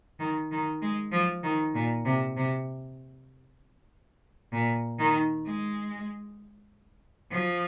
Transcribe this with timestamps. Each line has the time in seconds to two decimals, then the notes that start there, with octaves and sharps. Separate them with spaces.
0.19 D#3
0.51 D#3
0.82 G#3
1.12 F3
1.43 D#3
1.74 A#2
2.05 C3
2.37 C3
4.52 A#2
4.99 D#3
5.45 G#3
7.31 F3